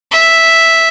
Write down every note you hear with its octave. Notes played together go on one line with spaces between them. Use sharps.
E5